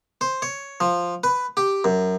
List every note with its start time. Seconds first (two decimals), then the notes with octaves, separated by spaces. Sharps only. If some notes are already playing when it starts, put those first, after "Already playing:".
0.21 C5
0.42 C#5
0.80 F3
1.24 B4
1.57 G4
1.84 F#2